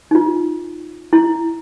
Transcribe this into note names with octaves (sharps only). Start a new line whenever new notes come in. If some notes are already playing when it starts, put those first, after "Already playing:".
D#4 F4
E4